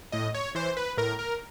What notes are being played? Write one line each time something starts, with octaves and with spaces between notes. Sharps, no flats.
A2 D#5
C#5
E3 C5
B4
A2 A#4
A#4